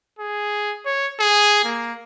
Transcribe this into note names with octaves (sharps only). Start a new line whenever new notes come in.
G#4
C#5
G#4
A#3